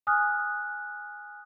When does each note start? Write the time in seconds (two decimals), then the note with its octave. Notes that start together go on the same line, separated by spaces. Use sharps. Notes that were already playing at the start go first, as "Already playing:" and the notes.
0.07 G#5 D#6 F6 F#6